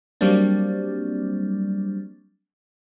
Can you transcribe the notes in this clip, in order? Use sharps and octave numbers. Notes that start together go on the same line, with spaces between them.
F#3 G3 A#3 C4 D4